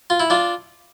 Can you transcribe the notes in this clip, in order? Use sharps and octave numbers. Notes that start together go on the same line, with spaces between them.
F4
E4
D4 F4